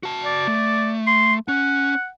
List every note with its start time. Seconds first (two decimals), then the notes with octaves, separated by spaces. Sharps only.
0.03 F#4 A5
0.25 D5
0.47 A3
1.07 C6
1.48 C#4 F#5